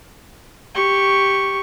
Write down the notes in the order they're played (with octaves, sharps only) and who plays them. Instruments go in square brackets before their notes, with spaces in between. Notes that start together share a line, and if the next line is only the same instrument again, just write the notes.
[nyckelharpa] G4 C#6